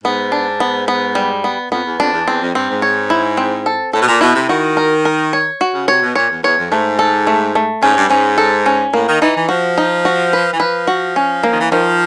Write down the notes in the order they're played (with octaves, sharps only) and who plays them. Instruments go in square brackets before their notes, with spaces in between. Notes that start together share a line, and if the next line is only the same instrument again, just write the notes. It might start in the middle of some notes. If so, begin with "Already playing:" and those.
[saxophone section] G#2 [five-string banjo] B3
[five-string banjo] D4
B3
B3
G3
B3
[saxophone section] F2 [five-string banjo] B3
[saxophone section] E2
[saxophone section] F2 [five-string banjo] D4
[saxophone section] E2
[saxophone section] E2 [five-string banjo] C4
[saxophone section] F2
[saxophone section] G2 [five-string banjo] C4
[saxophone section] G#2
[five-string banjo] C#5
E4
C4
A4
[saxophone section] A2 [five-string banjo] A4
[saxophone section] B2
A#2
[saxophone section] B2 [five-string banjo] E4
[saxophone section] C3
[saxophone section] D#3 [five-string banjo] F#4
[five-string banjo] A#4
A#4
C#5
F#4
[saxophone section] C#3
[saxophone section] C3 [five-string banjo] C#5
[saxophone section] B2
[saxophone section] A#2 [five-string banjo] C#5
[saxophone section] E2
[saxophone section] E2 [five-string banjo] C#5
[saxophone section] F2
[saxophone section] G#2 [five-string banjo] A3
[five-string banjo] A4
A3
A3
[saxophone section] G#2 [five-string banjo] C#4
[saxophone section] G2
[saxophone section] G#2 [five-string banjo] C#4
[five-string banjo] A4
C#4
[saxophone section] A2 [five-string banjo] A#3
[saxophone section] D#3
[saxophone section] E3 [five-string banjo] D#4
[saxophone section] E3
[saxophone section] F3 [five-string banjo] F#4
[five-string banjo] D#4
F#4
B4
[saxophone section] E3
[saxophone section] F3 [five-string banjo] B4
[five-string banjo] F#4
C#4
A#3
[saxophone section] D#3
E3
[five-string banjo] D#3 [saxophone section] F3